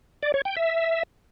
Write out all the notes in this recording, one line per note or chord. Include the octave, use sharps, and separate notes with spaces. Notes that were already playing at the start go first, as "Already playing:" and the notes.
D5
C#5
G5
E5